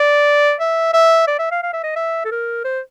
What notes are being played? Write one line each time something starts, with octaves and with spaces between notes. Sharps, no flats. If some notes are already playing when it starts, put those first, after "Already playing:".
Already playing: D5
E5
E5
D5
E5
F5
F5
E5
D#5
E5
A4
A#4
C5